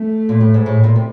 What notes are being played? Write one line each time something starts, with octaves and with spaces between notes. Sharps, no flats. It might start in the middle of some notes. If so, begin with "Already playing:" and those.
Already playing: A3
A#2
A2
G#2
A2
A#2
C3